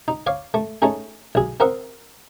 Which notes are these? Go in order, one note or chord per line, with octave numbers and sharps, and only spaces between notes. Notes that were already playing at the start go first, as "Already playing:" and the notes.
D#4
C#5 F5 D6
A3
A3 C#4 D#4 G#4
B1 G#4
C4 A#4 E5 F#5 D#6